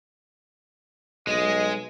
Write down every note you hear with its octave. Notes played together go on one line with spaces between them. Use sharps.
B1 G#3 G#4 D#5